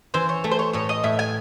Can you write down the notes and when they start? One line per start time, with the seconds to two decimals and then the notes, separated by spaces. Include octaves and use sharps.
0.14 E3 C5
0.29 C#5
0.44 A3
0.51 C5
0.59 C#5
0.73 A2 C#5
0.89 D#5
1.03 A2 E5
1.19 G#5